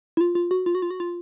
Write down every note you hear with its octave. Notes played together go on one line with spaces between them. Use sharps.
E4
F4
F4
F#4
F4
F#4
F4
F#4
F4